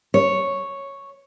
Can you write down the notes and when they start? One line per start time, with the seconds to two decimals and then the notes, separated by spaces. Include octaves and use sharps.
0.14 C#5